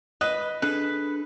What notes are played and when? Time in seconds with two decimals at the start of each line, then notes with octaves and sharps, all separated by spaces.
0.21 B4 D#5
0.62 D4 G#4 A4 B4